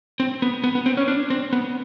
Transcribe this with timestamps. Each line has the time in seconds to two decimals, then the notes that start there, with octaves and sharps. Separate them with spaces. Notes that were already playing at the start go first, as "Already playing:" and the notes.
0.20 C4
0.42 B3
0.64 B3
0.75 B3
0.86 C4
0.97 C#4
1.08 D4
1.30 C4
1.53 B3